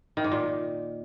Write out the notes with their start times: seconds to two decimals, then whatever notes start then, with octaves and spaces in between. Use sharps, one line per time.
0.17 D#3
0.24 G#2
0.32 A#2